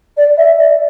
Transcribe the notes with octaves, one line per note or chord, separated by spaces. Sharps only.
D5
E5
D5